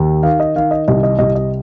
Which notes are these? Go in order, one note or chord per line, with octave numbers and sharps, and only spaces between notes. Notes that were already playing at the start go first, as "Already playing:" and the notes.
Already playing: D#2
D#3 F5
D#5
D#3 F5
D#5
C2 D#5
D#5
C2 D#5
D#5